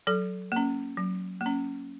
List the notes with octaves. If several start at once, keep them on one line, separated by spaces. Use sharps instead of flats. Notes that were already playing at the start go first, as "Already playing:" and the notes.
F#3 A4
A#3 C#4
F#3
A#3
C#4